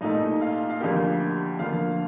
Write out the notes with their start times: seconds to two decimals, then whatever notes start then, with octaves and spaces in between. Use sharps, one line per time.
0.01 C2 A#2 A3 D#4 D#5
0.41 F4 F5
0.70 F5
0.80 D2 D3 F3 A#3 G4 G5
1.59 D2 D3 F3 A#3 F4 F5